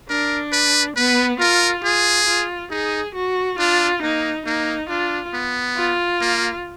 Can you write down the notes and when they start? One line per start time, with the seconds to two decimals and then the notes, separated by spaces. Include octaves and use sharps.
0.09 D4 A#4
0.52 B4
0.96 B3 B4
1.40 F4 A#4
1.84 F4 G#4
2.27 F4
2.70 D#4 G#4
3.15 F#4
3.58 D4 F4
4.02 A#3 D#4
4.46 A#3 D#4
4.89 D4 F4
5.34 B3
5.77 F4
6.21 A#3